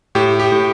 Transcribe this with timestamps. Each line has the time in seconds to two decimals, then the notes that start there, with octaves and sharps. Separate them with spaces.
0.15 A2 G4
0.40 G4
0.52 A2